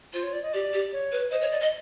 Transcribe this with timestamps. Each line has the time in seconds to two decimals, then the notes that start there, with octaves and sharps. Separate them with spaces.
0.13 F4 C5
0.23 C#5
0.33 D5
0.43 D#5
0.53 G4 D5
0.73 G4
0.93 C#5
1.12 B4
1.31 C5 D#5
1.41 C#5
1.51 D5
1.61 D#5